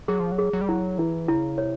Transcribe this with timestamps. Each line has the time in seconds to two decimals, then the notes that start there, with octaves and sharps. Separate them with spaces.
0.08 F#3 G#4
0.20 F3
0.32 F#3
0.38 G#4
0.53 F#3
0.61 G3
0.68 F#3 E4
0.98 E3 E4
1.28 C#3 E4
1.58 C3 C#5